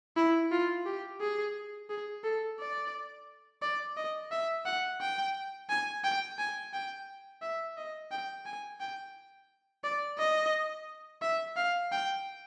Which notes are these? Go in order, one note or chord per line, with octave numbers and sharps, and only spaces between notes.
E4
F4
G4
G#4
G#4
A4
D5
D5
D#5
E5
F#5
G5
G#5
G5
G#5
G5
E5
D#5
G5
G#5
G5
D5
D#5
E5
F5
G5